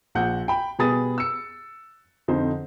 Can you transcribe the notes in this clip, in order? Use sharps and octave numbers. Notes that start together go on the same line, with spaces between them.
A#1 F#5 G6
G5 B5
B2 G3 G#4 B4 D#6 A6
E6 C#7
F2 D3 D#4 C5